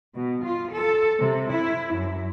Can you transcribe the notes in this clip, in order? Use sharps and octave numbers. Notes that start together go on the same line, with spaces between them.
B2
F4
A4
C3
E4
F#2